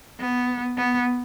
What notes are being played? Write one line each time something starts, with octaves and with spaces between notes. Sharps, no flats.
B3
B3